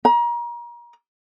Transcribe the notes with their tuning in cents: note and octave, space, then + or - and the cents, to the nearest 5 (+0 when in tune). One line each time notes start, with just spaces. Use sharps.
A#5 +30